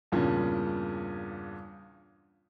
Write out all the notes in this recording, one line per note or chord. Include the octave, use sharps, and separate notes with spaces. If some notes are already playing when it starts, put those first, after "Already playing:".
E2 G2 A#2 C#3